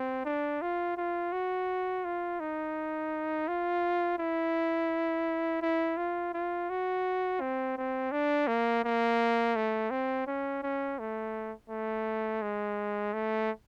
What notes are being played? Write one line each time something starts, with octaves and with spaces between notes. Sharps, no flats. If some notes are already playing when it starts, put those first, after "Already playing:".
Already playing: C4
D4
F4
F4
F#4
F4
D#4
F4
E4
E4
F4
F4
F#4
C4
C4
D4
A#3
A#3
A3
C4
C#4
C#4
A3
A3
G#3
A3